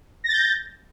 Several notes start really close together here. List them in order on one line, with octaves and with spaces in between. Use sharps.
A#6 A6 G6